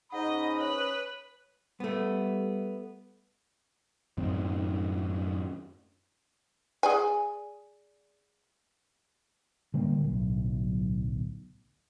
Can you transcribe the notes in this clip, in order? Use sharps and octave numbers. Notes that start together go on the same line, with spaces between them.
G#2 C#4 D#4 D#5 F#5 B5 D#6
B4 C#5 F#7
G3 A3 B3
F#2 A2 D#3 C4
G#4 D5 G#5
D3 G3 G#3 A#3
D1 B1